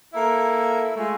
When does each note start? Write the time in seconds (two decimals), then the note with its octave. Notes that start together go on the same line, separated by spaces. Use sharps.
0.14 A#3 E4 A4
0.96 G#3 A3 F4